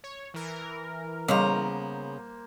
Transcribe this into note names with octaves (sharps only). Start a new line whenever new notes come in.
C#5
E3 A#4
C#3 G3 A#3 B3 G#4 C5 D#5 A#5